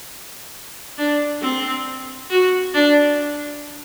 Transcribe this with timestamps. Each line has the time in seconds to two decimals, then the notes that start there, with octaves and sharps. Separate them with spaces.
0.98 D4
1.42 C4
2.31 F#4
2.74 D4